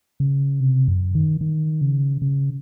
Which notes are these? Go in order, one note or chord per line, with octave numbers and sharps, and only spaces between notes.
C#3
C3
F#2
D#3
D#3
C#3
C#3